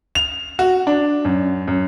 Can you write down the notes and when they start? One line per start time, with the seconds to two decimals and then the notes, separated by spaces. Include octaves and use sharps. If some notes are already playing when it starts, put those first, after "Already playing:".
0.15 F7
0.59 F#4
0.87 D4
1.25 F#2
1.68 F#2